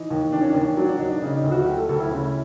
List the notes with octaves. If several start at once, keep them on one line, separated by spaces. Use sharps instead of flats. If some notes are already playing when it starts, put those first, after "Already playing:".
Already playing: E3 D#4
D#2
D#3 D4
C#4
D#2 D4
F#3 D4
D4
D#2 D#4
D4
C#3 D#4
D#4
D2
F#4
F#3 G4
A4
D2 A4
E4
C#3 E4